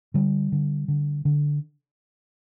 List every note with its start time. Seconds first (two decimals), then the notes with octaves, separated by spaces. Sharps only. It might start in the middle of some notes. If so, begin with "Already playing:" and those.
0.14 D3 G3
0.52 D3
0.88 D3
1.25 D3